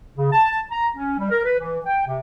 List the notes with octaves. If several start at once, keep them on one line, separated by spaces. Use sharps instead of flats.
C#3
A5
A#5
C#4
G3
A#4
B4
E3
G5
C3